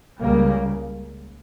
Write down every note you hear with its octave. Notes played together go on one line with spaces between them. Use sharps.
C#2 C#3 G3 A#3